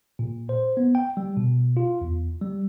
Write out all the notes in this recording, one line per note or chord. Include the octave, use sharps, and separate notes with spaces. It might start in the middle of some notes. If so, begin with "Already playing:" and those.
A#2
C5
B3
G5
G3
B2
F4
E2
G3